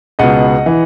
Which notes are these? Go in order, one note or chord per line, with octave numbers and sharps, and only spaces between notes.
C#2 B2 D#5 F#5
E3